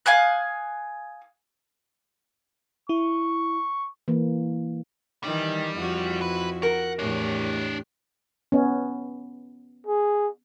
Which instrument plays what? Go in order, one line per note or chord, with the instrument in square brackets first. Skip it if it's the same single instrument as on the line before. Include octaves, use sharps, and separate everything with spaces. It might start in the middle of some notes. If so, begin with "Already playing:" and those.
[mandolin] F5 G#5 D#6 F#6
[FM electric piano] E4 [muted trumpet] C#6
[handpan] E3 A#3
[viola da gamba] D#3 E3 [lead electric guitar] G3
[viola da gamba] F2 E4 F#4
[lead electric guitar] B4
[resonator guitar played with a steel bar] A#4 [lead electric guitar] F#5
[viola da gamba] E2 A2 G4 [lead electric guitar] D4 C#5
[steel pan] B3 C#4
[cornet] G#4